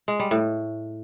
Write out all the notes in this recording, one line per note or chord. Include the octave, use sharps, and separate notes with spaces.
G#3
G3
A2